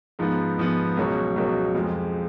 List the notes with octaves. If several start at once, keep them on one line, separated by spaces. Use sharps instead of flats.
G#2 F3 B3
G#2 F3 B3
C#2 B2 F#3 C#4
C#2 B2 F#3 C#4
F2 F3 G#3